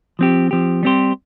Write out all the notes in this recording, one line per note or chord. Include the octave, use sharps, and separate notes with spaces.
F3 C4 G4
F3 C4 G4
G3 C4 G4 C5